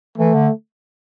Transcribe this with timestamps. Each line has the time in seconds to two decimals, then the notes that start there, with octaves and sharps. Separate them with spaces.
0.18 E3 A3
0.34 D3